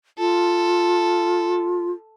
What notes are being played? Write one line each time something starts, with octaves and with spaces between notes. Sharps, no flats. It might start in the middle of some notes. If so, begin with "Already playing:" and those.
F4 A4